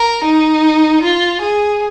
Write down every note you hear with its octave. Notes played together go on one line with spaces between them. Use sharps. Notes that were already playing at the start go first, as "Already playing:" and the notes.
Already playing: A#4
D#4
F4
G#4